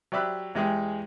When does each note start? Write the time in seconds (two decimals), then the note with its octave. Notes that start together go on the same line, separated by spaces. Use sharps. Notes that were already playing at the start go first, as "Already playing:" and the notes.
0.12 F#3 G4 D5 E5 B5 F#6
0.55 E2 G#3 G4 G#4